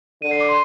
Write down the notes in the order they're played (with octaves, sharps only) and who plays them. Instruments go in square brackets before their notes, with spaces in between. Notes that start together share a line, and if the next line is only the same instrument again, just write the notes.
[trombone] D3 [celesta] D#7
[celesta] C7
D6
C6